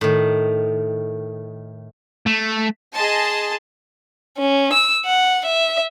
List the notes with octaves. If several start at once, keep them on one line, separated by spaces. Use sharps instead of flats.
A2 D#3
A3
G#4 D#5 A5 C6
C#4
E6
F#5
E5